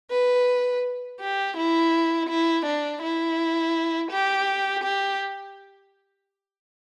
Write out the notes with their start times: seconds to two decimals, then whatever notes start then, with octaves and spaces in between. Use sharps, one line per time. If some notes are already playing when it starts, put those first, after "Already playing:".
0.11 B4
1.20 G4
1.57 E4
2.29 E4
2.66 D4
3.02 E4
4.11 G4
4.84 G4